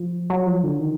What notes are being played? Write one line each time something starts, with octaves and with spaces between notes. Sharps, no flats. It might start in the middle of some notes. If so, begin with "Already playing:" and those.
Already playing: F3
F#3
F3
D3
D#3